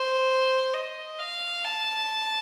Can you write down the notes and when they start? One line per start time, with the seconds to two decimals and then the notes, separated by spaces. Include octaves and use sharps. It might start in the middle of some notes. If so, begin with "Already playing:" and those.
Already playing: C5
0.73 D#5
1.19 F5
1.64 A5